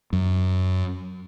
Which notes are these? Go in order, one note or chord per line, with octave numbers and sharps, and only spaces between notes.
F#2